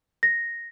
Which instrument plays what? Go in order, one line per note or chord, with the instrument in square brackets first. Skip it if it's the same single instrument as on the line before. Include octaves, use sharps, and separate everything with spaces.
[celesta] A#6